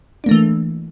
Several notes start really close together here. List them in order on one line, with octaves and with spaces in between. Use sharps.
D4 A#3 A3 E3